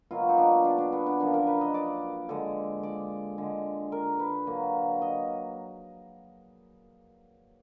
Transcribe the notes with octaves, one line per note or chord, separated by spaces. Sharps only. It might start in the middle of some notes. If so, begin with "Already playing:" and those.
B2 F#3 A#3 F4
D#4
D4
D4
D4
B3
D4
F#2 F3 A#3 D4
A#4
B4
D#5
D5
D3 G#3
D5
D3 G#3
A#4
B4
D3 F#3 A#3
D#5